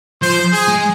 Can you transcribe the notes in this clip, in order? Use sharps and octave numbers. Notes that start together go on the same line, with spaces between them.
F3 C5
G#4
G#3